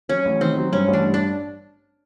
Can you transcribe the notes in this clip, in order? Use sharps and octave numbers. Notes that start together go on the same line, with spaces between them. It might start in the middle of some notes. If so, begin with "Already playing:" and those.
F#3 C#4
A1
D#3 C4
F#3
G2 C#4
A1
D4
G2
D4